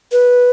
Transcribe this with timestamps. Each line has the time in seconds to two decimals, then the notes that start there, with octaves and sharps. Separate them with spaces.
0.12 B4